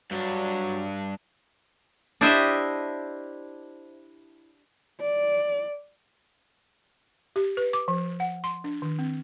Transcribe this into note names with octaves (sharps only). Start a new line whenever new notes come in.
G2 F#3 D4
D4 E4 G4 C5 D#5 E5
D5
G4
B4
D6
F3
F#5
C6
D4
D#3
C4